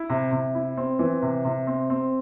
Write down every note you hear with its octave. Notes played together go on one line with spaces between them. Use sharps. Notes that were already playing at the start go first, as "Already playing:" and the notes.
Already playing: E4
C3
C3
E4
C4
E3
C3
C3
C4
C4